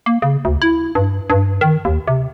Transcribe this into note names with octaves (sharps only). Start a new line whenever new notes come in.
A#3
C#3
D2
E4
G2
G2
D#3
D#2
C3